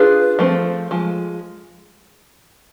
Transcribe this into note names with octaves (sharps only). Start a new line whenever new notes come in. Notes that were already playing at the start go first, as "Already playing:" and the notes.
Already playing: D4 F4 G#4 B4
F3 A3 C4
F3 G#3